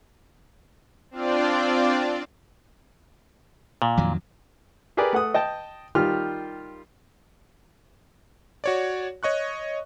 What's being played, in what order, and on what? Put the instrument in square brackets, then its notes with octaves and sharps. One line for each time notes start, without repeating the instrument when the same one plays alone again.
[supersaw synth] C4 D4 F4 D5
[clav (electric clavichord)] A#2
[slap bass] F2 D#3 F#3
[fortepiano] G4 G#4 A#4 B4 D5
A3 F#5 D#6
D#5 G5 A5
D#3 G3 F4 G4 F6
[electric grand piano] F#4 C#5 D5
C#5 D#5 C#6 F#6